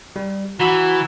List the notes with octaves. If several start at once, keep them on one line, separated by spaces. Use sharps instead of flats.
G3
E3 F#4 A#5 B5 E6